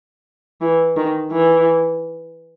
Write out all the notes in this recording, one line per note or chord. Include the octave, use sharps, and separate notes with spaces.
E3
D#3
E3